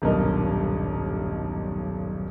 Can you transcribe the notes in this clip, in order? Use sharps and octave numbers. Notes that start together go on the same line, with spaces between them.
D#1 B1 G2 A#4 D#5